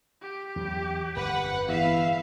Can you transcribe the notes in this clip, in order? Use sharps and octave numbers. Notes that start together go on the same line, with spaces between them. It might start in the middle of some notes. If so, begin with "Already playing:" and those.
G4
E2 F#3
G1 F2 B4 F#5
E2 E5 F5